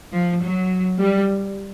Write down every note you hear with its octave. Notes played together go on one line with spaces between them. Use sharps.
F3
F#3
G3